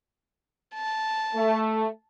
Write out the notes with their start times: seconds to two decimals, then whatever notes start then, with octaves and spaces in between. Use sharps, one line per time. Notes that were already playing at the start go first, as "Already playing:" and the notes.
0.75 A5
1.35 A3